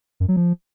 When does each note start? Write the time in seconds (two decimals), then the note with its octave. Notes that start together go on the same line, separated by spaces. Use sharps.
0.20 F#2
0.28 F#3
0.36 F3